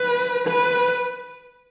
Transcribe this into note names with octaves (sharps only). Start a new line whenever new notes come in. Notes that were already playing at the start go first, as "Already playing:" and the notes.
Already playing: B4
B4